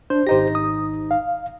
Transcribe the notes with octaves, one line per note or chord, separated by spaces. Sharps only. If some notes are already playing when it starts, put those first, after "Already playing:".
D4 C5
G#1 D#4 G4 C5 A#6
D#6
F5